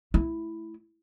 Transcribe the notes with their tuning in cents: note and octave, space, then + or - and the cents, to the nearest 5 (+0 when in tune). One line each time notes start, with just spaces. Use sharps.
A3 -10 E4 +0